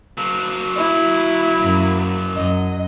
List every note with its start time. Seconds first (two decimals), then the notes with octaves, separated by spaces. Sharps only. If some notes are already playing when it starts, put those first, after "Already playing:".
0.18 F#3 A#3
0.76 E4
1.61 F#2
2.36 F#2 D#5